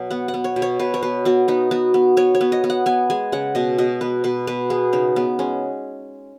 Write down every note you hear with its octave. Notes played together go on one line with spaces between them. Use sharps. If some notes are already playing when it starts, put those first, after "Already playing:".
Already playing: B2 F#3
B3 F#5
F#5
B3
C#5
B2
C#5
B2 B4
C#5
B2 B4
B3 F#4
B3 D#4
B3 F#4
B3
B3 C#5
C#5
B3
D#5
B3
F#5
B3 G#5
G#3 G#5
C#3 F#5
B2 D#5
B2 D#5
B3 B4
B2 B4
B2 B4
B3 G#4
C#3 D#4
C#3 B3
G#3 C#4